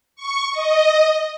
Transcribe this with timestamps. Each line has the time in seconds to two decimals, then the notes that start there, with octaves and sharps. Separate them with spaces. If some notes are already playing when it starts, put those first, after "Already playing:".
0.16 C#6
0.52 D#5